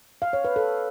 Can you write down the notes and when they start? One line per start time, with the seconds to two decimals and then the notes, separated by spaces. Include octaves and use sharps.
0.22 F5
0.33 C#5
0.45 B4
0.56 A4